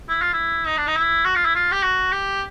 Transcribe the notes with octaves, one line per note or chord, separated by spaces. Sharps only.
E4
F4
E4
D#4
D4
D#4
E4
F#4
F4
E4
F4
G4
F#4
G4